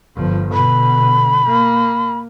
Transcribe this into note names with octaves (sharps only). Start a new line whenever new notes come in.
G1 F3
B2 D3 B5
A#3